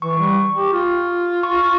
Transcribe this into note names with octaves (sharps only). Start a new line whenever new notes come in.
E3 C#6
G3
G4
F4
C#6